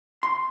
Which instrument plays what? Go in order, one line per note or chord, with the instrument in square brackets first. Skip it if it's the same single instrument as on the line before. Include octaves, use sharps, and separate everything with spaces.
[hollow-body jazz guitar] C6